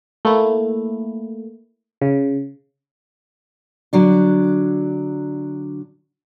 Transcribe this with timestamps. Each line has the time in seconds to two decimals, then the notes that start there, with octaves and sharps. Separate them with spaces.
0.25 A3 A#3 E4
2.02 C#3
3.93 D3 F#3 D4